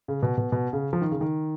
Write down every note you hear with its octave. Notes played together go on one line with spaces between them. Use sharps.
C#3
B2
B2
B2
C#3
F3
D#3
C#3
D#3